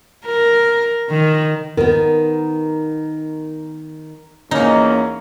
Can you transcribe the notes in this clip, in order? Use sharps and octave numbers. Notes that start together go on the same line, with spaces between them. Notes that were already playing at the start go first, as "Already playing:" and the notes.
A#4
D#3
D#3 B3 A#4
E2 A#3 C#4 D#4